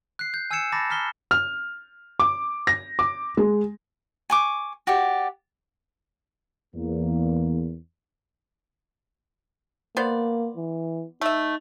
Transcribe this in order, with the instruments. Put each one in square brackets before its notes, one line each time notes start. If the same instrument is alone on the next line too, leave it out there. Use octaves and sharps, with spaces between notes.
[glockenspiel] F#6 C7
G6
G#5 E6 G6 G#6 C#7 E7
A5 B5 D6 A6 A#6
A#5 F6 B6 G7
[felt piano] F6
D6
A#6
D6
G#3
[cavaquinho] G#5 C#6 D6
F#4 G4 D5
[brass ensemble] E2 A#3
[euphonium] A#3 [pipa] B3 C5 D5
[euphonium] E3
[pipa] A3 E5 [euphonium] D#4